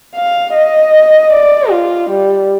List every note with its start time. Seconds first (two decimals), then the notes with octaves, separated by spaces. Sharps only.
0.15 F5
0.54 D#5
1.32 D5
1.70 F4
2.10 G3